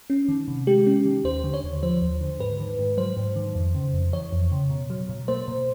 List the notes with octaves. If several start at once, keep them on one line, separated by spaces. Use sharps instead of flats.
C#4
D#3
C3
G#3 G4
C#4
D#3
D#2 C5
D3
C#5
D#2
F3 C5
D#2
D3
G#2 B4
D#3
G#2
F#3 C5
G#2
D#3
F2
C#3
F2
E3 C#5
F2
C#3
B2
F#3
B2
A#3 C5
B2